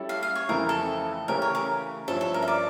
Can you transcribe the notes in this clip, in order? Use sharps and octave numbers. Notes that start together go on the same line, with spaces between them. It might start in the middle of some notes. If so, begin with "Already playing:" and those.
Already playing: G3 C#4 E4 A4
F5
F5
C#5
F2 C#3 E3 A3 E4 A#4
A4
C#3 E3 A3 C#4 G4 A#4
C#5
A#4
G2 F3 C#4 E4 A4
A4
A#4
E5
D5